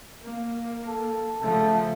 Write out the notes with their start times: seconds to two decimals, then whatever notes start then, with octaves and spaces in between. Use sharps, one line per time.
0.21 A#3
0.87 A4
1.41 C#3 F3 A3 A4